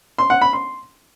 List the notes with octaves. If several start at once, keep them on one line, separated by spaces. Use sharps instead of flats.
C6
F#5
B5
C6